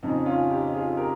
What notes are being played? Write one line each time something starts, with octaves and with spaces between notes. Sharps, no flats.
F2 C#3 D#4
C#4 F4
D#4 G4
F4 G#4
G4 A#4